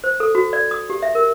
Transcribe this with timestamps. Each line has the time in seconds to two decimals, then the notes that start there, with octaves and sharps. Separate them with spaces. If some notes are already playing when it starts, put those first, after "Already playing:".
0.04 C5
0.20 A4
0.35 F#4
0.53 D5
0.71 D#6
0.90 G4
1.02 E5
1.15 A#4